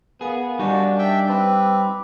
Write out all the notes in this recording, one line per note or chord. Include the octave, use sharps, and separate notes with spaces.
B3 G#4 A#4 F5 G#5
G3 D4 D#4 F#4
E5 G5
C4 B4 D6 E6
D6